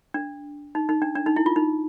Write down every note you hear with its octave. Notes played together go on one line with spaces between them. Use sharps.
D4
D#4
D#4
D4
D4
D#4
E4
F4
D#4